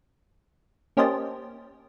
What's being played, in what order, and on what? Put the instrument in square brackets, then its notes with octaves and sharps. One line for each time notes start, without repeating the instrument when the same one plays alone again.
[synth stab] A#3 C#4 G4 C5 D#5 A5